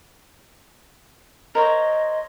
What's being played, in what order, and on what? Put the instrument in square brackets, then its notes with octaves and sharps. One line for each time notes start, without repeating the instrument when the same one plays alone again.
[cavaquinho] A#4 C5 C#5 [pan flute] D#5